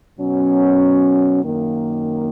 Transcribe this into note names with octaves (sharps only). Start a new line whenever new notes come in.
B2 F#3 C#4
F#2 D#3 A#3